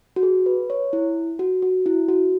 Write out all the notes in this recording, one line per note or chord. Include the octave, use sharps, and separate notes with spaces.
F#4
G#4
B4
C#5
E4
F#4
F#4
E4
F#4